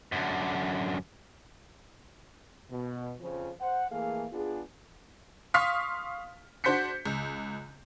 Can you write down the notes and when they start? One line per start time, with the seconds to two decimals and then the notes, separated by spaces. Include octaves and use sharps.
0.12 F#2 D3
2.71 B2
3.21 F2 C#3 F3
3.61 C5 F#5
3.91 E3 A3 A#3 G#4 F5
4.33 B3 D4 F4 G#4
5.54 F5 C6 C#6 D#6 F6 B6
6.64 D4 F#4 C5 G6 B6 C#7
7.05 C#2